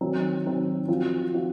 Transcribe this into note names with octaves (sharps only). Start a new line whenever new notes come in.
D#3 F#3 C4
D#3 F#3 C4
F3 C4 F#4
F3 C4 F#4